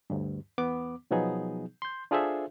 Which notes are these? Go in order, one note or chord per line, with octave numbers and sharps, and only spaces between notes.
D2 G2
E2 B3 D6
B2 F3 F#3 B3 D#4 G#4
C6 G6
D4 F4 G#4 A4 C5 E5